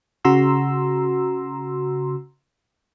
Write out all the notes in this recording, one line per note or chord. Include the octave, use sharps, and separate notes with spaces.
C#3 F#4 A#5 C6 E6